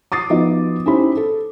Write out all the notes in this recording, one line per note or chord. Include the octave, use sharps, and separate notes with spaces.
D6 D#6 A6 C7
F3 B3 D#4 F#4 D#5
C#4 D#4 E4 G4 C5 B5
A4